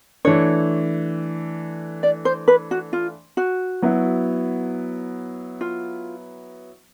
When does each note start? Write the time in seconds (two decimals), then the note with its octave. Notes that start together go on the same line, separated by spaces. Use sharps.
0.25 E3 A3 D4 C#5
2.03 D5
2.25 C5
2.48 B4
2.71 F#4
2.93 F4
3.37 F#4
3.82 F#3 B3 E4
5.61 F4